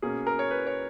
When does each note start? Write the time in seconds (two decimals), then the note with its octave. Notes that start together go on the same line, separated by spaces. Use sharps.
0.02 B2 A#3 C#4 G#4
0.27 A#4
0.39 C#5
0.51 B4
0.67 C#5